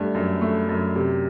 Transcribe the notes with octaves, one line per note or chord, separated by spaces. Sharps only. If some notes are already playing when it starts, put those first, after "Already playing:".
Already playing: G2 A3
F#2
A3
F#2
C3